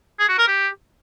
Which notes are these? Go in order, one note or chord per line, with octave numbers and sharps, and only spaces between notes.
G#4
F#4
A#4
G4